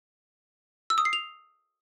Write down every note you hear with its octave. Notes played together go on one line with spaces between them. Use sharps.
E6
D#6
C7
F7